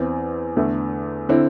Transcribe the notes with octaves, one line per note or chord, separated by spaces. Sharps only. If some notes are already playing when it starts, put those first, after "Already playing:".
Already playing: E2 E3 C4 E4
E2 D3 A3
D3 C4 E4